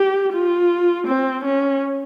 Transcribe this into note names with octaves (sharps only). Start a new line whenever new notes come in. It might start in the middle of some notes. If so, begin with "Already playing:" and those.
Already playing: G4
F4
C4
C#4